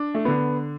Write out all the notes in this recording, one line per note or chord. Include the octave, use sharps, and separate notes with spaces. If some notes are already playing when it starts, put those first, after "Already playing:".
Already playing: D4
A3
D3 B3